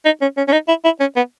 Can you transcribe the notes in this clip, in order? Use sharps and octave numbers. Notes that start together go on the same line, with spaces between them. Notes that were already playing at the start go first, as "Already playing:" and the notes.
D#4
C#4
C#4
C#4
D#4
E4
E4
C#4
B3